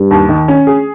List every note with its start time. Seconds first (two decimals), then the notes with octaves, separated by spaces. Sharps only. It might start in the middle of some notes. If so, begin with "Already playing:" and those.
Already playing: G2
0.11 D#2
0.29 D#3
0.48 C#4
0.67 G#4